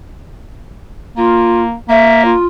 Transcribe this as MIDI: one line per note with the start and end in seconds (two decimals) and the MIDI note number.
1.17 1.74 58
1.17 1.61 65
1.89 2.33 58
1.89 2.22 76
2.24 2.46 65